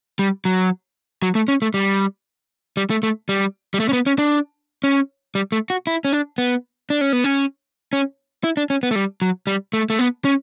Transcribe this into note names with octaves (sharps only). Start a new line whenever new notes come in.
G3
F#3
F#3
A3
C#4
A3
G3
G3
A3
A3
G3
G3
A3
C#4
B3
C#4
D4
C#4
G3
A3
F#4
E4
C#4
D4
B3
D4
C#4
B3
C#4
C#4
E4
D4
C#4
B3
A3
G3
F#3
G3
A3
A3
B3
C#4